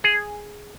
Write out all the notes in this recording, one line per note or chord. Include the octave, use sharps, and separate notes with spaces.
G#4